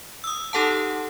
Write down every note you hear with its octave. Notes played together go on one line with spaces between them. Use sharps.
D#6 E6
D#4 G4 A4 F#5 A5